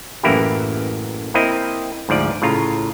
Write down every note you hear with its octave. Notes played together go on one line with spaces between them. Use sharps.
A1 F#2 E3 A#3 E4 G4
A#3 C4 E4 D#5
D2 G#2 F3 D5
A2 C#3 F4 A#5